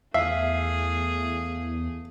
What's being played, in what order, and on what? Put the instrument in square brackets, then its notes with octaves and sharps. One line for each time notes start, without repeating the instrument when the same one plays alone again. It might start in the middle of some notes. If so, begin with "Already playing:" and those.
[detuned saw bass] E2 [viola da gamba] A3 G#4 [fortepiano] E5 [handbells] F5